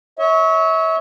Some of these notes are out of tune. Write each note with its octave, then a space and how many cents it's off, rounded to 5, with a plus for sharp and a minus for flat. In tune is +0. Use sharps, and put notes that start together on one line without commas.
C#5 +5 E5 -35